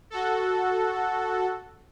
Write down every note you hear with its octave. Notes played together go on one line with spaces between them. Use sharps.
F#4 A4